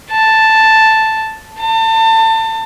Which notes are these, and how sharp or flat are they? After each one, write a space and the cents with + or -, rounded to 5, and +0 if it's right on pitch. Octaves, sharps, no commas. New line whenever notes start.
A5 +0
A5 +30